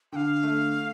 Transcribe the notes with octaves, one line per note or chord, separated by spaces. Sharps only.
D3 F5 G5
A3